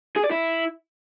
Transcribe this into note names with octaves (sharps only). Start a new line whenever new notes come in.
G#4
D5
E4